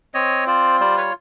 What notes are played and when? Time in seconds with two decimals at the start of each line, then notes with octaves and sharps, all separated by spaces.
0.14 C4 C#5 D#5
0.47 F4 C5 D5
0.80 G3 C5 D5
0.97 B4 C#5